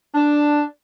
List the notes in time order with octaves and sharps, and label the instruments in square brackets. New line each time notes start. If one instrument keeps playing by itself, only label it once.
[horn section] D4